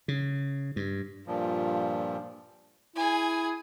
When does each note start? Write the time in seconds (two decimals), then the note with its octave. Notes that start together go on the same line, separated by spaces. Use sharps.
0.08 C#3
0.76 G2
1.27 G2 A#2 F3
2.96 E4 G#4 G#5